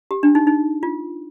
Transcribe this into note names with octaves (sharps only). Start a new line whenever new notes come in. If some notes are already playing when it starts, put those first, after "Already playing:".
G4
D4
D#4
D#4
F4